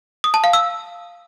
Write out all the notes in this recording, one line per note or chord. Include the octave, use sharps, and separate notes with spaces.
D#6
A5
F5
E6